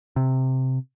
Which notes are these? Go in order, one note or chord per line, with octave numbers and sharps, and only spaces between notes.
C3